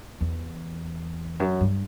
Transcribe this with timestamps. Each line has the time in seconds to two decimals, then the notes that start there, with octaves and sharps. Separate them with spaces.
0.20 E2
1.40 F#2
1.61 G2